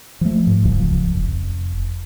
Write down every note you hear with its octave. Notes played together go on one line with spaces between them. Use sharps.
F3 A3
G#2
D1 C#2 F#2 F3
F1